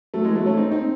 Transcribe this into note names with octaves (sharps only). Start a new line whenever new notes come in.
F#3 A3
E3 G#3
F#3 A3
A3 C#4
C4 D#4
C4 D#4